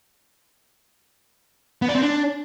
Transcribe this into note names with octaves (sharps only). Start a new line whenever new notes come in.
B3
D5
C4
D4